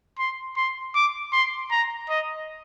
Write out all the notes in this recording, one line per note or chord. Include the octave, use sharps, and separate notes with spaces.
C6
C6
D6
C6
A#5
D#5